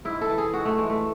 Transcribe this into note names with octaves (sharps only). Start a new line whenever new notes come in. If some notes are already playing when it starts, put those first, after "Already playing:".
G#2 E4
A4
E3
G#4
G#2 F#4
A3
E3 G#3
A3